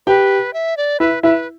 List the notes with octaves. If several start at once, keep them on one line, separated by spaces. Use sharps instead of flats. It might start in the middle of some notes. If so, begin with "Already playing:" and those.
G4 B4 G5
E5
D5
E4 B4 E5
E4 B4 E5